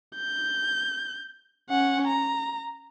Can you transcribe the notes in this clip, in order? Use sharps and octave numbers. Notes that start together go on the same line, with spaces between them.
G6
C#4 F#5
A#5